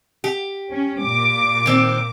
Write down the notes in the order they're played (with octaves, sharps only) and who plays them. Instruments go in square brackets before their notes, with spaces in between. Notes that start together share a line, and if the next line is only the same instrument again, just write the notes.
[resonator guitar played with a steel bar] G4
[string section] C#4
A#2 D6
[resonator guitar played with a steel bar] D#3 C4